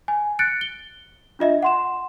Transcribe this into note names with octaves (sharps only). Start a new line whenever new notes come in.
G#5
F#6 A6 C#7 D7
G7
D4 F4 D#5 E5
F#5 C6 E7